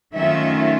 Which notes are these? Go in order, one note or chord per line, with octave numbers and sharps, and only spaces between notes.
D#3 F#3 A3 C#4 F4 E5